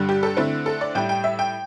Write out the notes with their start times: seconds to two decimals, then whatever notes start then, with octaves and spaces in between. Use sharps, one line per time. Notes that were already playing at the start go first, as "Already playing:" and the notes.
Already playing: G2 D3 G3
0.09 G4
0.23 A4
0.37 D3 A3 C4 E4
0.66 A4
0.81 D5
0.95 A2 G3 E4 G5
1.09 G5
1.24 E5
1.39 G5